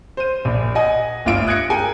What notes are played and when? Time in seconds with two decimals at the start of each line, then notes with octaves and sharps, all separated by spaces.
0.17 C5 D#7
0.45 A#1 A#2
0.75 D#5 F#5 G#5 D#6
1.25 G1 D2 F4 E5 D7
1.47 D#6 F#6 G#6 A#6 C#7 D7
1.70 G#4 A#4 G5 G#5